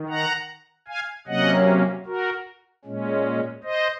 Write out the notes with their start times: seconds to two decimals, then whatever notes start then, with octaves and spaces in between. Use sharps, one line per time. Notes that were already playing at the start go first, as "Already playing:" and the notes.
Already playing: D#3
0.09 F#5 A#5
0.88 F5 G#5
1.27 C3 F#3 A#3 C#4 D#5 F#5
2.06 F#4 A#4
2.85 A#2 G#3 C#4
3.64 C5 D#5